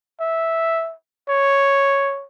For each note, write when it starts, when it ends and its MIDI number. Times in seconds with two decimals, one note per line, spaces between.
0.20 0.94 76
1.29 2.25 73